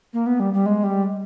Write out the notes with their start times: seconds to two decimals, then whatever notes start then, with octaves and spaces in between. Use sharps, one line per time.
0.13 A#3
0.26 B3
0.40 G3
0.54 G3
0.66 G#3
0.84 G3